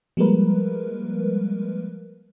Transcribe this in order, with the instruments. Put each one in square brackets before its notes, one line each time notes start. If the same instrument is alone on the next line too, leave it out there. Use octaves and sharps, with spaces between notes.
[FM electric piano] F3 G3 G#3 A#3 A#4 B4